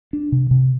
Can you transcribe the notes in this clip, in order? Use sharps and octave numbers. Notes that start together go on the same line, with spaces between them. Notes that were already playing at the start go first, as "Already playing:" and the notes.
D4
C3
C3